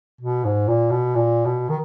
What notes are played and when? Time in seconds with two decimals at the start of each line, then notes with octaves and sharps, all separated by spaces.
0.21 B2
0.44 G#2
0.68 A#2
0.90 B2
1.15 A#2
1.45 B2
1.69 D#3